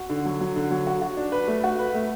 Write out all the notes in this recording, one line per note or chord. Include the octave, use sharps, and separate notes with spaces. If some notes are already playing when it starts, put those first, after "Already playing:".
Already playing: F#4
D3
F#3
F#3
D3
F#3
F#4
F#4
D4
B4
A3
F#4
B4
A3